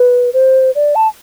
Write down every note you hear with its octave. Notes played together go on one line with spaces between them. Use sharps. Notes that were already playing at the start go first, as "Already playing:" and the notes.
Already playing: B4
C5
D5
A5